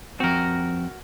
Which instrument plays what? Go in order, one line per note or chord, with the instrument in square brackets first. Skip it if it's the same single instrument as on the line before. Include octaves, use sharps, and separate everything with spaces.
[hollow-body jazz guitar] F2 C4 [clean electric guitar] F#4 A#4